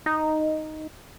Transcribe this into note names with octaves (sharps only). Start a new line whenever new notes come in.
D#4